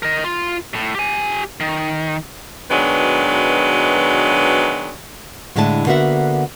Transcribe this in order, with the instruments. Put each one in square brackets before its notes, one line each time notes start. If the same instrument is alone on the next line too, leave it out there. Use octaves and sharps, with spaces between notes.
[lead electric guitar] A#4 D#5
F4
A2
G4 G#5
D#3
[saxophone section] B2 D#3 F#3 G#3 D4 B4
[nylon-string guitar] A2 D3 G#3 D4 E4 A5
D3 A#3 B3 F#4 E5 F#5